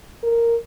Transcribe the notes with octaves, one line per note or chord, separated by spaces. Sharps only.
A#4